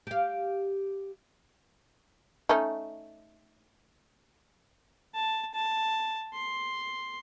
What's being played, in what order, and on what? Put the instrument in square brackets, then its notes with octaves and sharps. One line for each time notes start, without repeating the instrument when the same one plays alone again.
[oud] G4 F5
[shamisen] A3 C#4 D#4
[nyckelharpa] A5
A5
C6